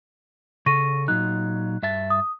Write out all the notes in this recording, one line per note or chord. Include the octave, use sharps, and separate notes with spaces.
C#3 A4 C#6 A#6 D#7
A#2 F#3 D#4 F#6
G2 E5 A5
D#6